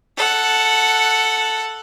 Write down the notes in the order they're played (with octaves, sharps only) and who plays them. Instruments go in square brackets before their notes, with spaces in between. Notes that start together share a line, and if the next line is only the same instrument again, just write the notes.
[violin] A4 F#5